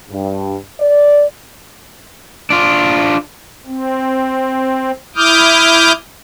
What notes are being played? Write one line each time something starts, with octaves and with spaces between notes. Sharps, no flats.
G2
D5
D4 F4
C4
E4 D6 D#6 F6 G6